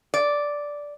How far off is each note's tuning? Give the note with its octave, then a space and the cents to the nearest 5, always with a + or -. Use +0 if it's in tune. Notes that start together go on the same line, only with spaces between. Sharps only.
D5 -5